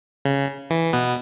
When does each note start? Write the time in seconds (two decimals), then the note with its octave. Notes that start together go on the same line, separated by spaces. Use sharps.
0.25 C#3
0.70 E3
0.93 B2 B3